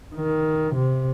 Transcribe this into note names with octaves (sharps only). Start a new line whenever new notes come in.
D#3
C3